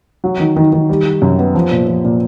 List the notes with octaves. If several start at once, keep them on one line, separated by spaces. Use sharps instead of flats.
F#3
D#3
D#3
D#3
G3
G3
F#2
B3
F3
A#2
F3
A#2